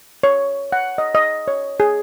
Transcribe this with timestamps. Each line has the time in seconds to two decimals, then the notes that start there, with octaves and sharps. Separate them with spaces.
0.23 C#5
0.72 F#5
0.98 D#5
1.15 D#5
1.48 C#5
1.80 G#4